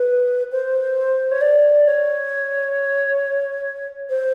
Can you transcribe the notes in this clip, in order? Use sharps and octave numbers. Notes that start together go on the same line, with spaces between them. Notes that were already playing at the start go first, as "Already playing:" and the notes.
Already playing: B4
C5
C#5
D5
C#5
C5